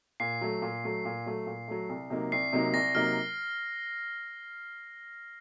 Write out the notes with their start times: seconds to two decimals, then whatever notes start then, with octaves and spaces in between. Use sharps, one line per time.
0.20 A#2 C7
0.41 F#3 A3
0.62 A#2
0.84 F#3 A3
1.05 A#2
1.26 F#3 A3
1.46 A#2
1.68 F#3 A3
1.89 C2
2.10 C3 F#3 A#3 D#4
2.32 C2 C7
2.53 C3 F#3 A#3 D#4
2.74 C2 A#6
2.95 C3 F#3 A#3 D#4 F6